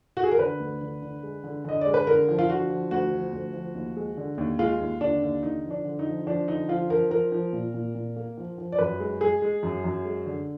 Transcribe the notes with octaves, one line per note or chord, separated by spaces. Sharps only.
F#4
G#4
A#4
D3 B4
D2
D3
D3
G#3
D3
D3 D#5
G#3 D5
B4
D3 A#4
F3
F4
D3 F#4
F3
D2 F#4
F3
D2
F3
D#2
G#3
D3
D#2
G#3 F4
D#2
D3 D4
D#2
D3 D#4
F3
D4
D3
D#4
F3
F3 D4
D3 D#4
F3 F4
F3 A#4
F3 A#4
F3
A#2
A#2
A#2
A#3
F3
F3
D5
F#2 B4
G#3
G#3 G#4
G#3
F#2
F#2
G#3
D3